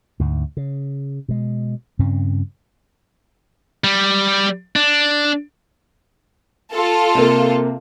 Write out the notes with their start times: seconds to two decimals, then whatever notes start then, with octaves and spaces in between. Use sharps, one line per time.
0.20 D2 G#2
0.57 C#3
1.29 B2 G#3
1.99 G2 C#3 C4 C#4
3.84 G3
4.76 D4
6.73 F4 A4
7.15 C3 A#3